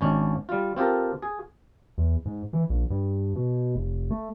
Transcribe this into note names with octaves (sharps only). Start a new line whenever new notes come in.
G#1 C#4 D4
G3 F4
C4 F4 G4 A4 A#4
G#4
E2
G#2
E3
A#1
G2
B2
F1
A3